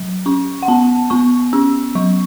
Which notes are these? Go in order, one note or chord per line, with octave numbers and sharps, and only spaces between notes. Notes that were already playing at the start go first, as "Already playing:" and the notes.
Already playing: F#3
C#4 C#6
F#5
B3 A5
B3 C#6
C#4 E6
F#3 C#6